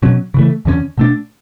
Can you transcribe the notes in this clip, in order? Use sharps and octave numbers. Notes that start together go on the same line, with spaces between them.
B2 F#3 C#4
C#3 E3 A3
E2 D3 A3 C#4
B2 A3 D4